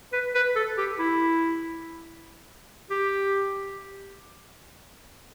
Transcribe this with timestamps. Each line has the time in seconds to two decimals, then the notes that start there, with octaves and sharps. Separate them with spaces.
0.13 B4
0.35 B4
0.56 A4
0.78 G4
0.99 E4
2.91 G4